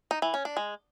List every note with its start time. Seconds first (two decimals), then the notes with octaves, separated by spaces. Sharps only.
0.11 D#4
0.22 E3
0.34 C#4
0.45 D4
0.57 G#3